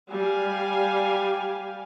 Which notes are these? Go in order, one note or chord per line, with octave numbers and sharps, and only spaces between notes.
G3 G4 F5 G#5